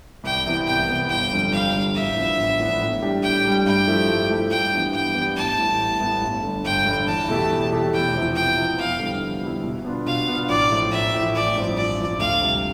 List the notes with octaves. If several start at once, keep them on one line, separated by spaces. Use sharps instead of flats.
C2 G5
C3 E3 B3
C2 G5
C3 E3 B3
G1 G5
F2 D3 G3
G1 F5
F2 D3 G3
A1 E5
A2 F3 B3 D4
A1
A2 F3 B3 D4
A2
G3 D4 G4
A2 G5
G3 D4 G4
G2 G5
F3 A3 E4 G4
G2
F3 A3 E4 G4
G2 G5
E3 B3 D4 G4
G2 G5
E3 B3 D4 G4
A1 A5
A2 G3 B3 E4
A1
A2 G3 B3 E4
G1
G2 D3
G1 G5
G2 D3
E2 A5
B2 A3 E4 G4
E2
B2 A3 E4 G4
E2 G5
C3 F3 B3 E4
E2 G5
C3 F3 B3 E4
F2 F5
D3 G3 B3 E4
F2
D3 G3 B3 E4
B2
B3 D4 F4
B2 F5
B3 D4 F4
A1 D5
A2 F3
A1 E5
A2 F3
A1 D5
G2 F3 C4
A1 D5
G2 F3 C4
D2 F5
C3 G3